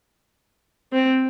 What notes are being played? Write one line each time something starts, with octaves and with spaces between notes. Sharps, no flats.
C4